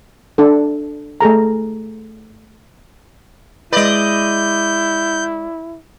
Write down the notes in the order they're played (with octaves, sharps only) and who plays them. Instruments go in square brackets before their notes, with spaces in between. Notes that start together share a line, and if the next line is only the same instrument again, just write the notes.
[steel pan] D4 A4
A3 G#4 A4 A#5
[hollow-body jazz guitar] G#3 B4 [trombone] E4 [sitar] D5 D#5 [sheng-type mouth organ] G6